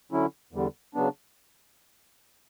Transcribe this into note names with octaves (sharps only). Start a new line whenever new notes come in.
D3 F#3 C#4 E4
E2 D3 G3
C#3 F#3 B3 D4